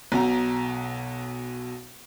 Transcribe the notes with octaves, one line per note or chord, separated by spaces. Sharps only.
B1 B2 A#5